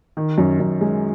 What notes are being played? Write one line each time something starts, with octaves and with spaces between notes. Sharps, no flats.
D#3
F#2
F#2
G#3